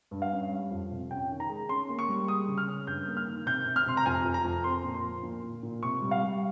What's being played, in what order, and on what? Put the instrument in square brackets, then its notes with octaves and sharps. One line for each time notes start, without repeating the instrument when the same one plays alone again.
[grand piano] G2
F5
C#4
G3
F2
C3
C#4 G5
D#3
A#5
G#3
C#4 C6
A#3
C#6
G3
G#3 D#6
C#3
F6
C#4
G2 G6
A#3
F6
D#3
C3 G6
C3
F6
C3 C6
A#5
F2 G#5
F2
A#5
F2
C4 C6
A#2
C6
F3
A#2
A#2
A#2
C3 C#6
G3
F5
G3